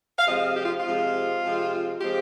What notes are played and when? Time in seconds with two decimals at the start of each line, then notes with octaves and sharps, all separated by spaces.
0.18 F5
0.26 C3 F3 G#3 C4 D#5
0.56 G4
0.64 F4
0.80 F4
0.85 C3 F3 G#3 C4
1.43 C3 F3 G#3 C4
2.01 C3 F3 G#3 C4 G4